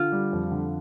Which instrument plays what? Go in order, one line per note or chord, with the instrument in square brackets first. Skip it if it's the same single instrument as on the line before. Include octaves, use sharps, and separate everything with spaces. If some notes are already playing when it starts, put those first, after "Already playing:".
Already playing: [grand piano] D3 [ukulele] F4
[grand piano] G3
F2
D3